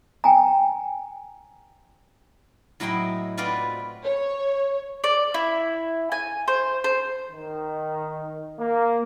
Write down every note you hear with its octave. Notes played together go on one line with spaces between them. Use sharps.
G5 G#5 A#5
A2 F#3 E4 D#5 G5 C6
C4 F4 F#4 B4 D5
C#5
D5
E4
G#5
C5
C5
D#3
A#3